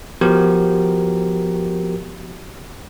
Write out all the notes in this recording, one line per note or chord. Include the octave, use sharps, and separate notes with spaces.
F3 B3 F#4 G4 A#4